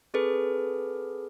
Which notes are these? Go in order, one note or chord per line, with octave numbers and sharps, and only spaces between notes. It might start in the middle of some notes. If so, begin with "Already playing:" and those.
C4 G#4 A4 B4